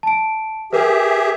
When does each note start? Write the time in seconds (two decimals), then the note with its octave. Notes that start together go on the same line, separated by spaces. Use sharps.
0.03 A5 D7
0.73 G4 G#4 A#4 B4 E5